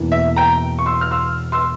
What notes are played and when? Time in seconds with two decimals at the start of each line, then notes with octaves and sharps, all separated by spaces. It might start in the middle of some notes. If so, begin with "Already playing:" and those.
Already playing: E1 E2 E3 A#3
0.12 E5
0.36 G5 A#5
0.79 C#6
0.86 C6 E6
1.01 F6
1.11 C6 E6
1.52 C6 E6